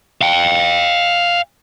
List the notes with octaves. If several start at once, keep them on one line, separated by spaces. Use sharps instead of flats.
F5 G5